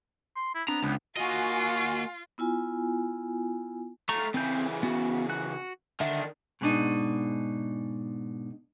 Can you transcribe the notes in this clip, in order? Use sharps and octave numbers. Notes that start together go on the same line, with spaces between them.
C6
E4
B3 C4 D4 A#5
C#2 B3
A#3 F4 F#4 D#5 G#5
B3 E4 F4 G#5
A3 F4 A#5 C#6
C#3 E3 C4 G6
B3 F#4
F#4 F#6
D3 D#3 D4 E5 F#5
G#2 B2 G#3 A#3 D4 D#4